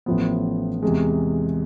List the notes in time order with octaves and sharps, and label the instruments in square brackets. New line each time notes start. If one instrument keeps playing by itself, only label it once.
[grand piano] A1 A2 F3 B3
E2 C3 G#3